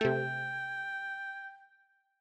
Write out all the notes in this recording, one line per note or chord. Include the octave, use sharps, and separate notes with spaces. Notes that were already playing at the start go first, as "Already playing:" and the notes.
C3 A3 G5